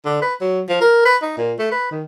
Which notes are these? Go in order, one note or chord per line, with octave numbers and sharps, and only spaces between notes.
D3
B4
F#3
F3
A#4
B4
D#4
A#2
A3
B4
D#3